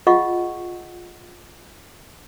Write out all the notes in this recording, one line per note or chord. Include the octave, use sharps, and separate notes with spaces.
F4 G#4 D#5 F5 F#5 C#6